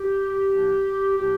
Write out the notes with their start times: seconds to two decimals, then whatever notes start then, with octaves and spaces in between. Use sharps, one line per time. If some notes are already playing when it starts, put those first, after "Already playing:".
Already playing: G4
0.49 A2 F3 A#3 D4
1.16 A2 F3 A#3 D4 G4